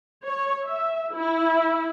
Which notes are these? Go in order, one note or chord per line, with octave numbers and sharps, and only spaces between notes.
C#5
E5
E4